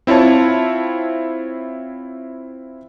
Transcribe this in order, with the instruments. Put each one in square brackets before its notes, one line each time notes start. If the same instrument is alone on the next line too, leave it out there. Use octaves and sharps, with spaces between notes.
[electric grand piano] C4 E4 F4 C#5 A5